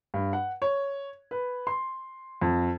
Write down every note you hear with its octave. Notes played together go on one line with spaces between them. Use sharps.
G2
F#5
C#5
B4
C6
F2